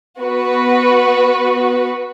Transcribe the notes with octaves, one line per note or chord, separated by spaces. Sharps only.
B3 F#4 B4